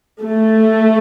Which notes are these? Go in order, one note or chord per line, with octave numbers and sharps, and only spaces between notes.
A3